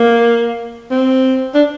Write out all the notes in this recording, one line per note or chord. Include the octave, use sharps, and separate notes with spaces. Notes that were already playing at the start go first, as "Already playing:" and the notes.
Already playing: A#3
C4
D4